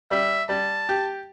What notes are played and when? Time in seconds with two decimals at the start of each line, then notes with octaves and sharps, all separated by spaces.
0.11 G3 E5
0.49 G3 A5
0.89 G4